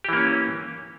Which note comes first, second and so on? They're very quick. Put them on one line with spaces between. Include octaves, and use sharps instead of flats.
G4 E3 A#3 C#4